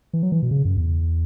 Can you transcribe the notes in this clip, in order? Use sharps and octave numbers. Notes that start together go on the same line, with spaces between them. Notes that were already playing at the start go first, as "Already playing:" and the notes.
E3
F#3
E3
B2
C#3
F#2
E2